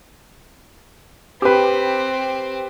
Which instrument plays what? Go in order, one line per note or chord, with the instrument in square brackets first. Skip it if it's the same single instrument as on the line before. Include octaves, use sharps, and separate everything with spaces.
[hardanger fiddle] C4 [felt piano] G4 B4